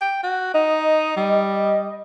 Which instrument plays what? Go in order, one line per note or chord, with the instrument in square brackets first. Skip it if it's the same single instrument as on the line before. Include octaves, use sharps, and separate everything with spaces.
[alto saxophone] G5
F#4
[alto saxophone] D#4 [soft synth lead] D#5
[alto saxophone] G3